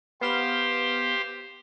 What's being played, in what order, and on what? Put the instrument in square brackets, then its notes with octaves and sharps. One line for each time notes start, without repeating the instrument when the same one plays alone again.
[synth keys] B3 F5 E7 [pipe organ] G4 C5